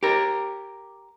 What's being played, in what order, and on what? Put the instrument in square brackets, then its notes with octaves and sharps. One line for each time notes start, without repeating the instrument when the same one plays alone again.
[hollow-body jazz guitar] G4 A#4